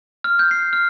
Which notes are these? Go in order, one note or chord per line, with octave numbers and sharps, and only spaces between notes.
F6
G6
C7
F6